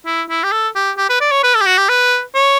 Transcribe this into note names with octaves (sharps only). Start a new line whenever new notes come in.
E4
E4
G4
A4
G4
G4
B4
D5
C#5
B4
A4
G4
F#4
G4
B4
C#5